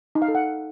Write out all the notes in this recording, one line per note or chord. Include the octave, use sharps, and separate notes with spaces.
D#4
F5
A4
F#5